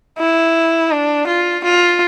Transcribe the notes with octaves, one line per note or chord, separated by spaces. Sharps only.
E4
D4
F4
F4